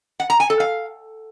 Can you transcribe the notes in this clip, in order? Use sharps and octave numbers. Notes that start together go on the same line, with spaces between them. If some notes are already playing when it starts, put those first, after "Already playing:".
F#5
A#5
G#5
A4
F5